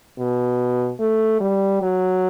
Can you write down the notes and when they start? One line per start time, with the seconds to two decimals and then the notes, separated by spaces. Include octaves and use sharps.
0.18 B2
1.00 A3
1.40 G3
1.82 F#3